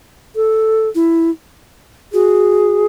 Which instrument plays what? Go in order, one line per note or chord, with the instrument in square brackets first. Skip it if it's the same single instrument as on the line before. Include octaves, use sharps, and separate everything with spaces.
[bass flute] A4
[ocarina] E4
[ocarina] F#4 [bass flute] G#4